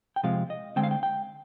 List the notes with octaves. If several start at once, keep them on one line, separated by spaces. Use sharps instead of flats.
G5
C3 F3 G#3 C4 F5
D#5
D3 G#3 C4 G5
F5
G5
G5